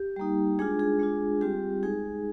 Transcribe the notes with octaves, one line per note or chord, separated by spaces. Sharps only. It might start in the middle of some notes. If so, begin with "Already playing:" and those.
Already playing: G4
G3 A#3 D#4
G#3 D4 F4 G#4
G#4
G#3 D4 F4
G3 C4 F4 G4
G#3 D#4 G#4